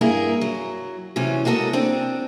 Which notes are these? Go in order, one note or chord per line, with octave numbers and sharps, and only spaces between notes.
G2 A#3 E4 G#4 A#4
F#3
C3 E3 F#3 C#4
G#3 A#3 F#4 A4 D#5
C4 D4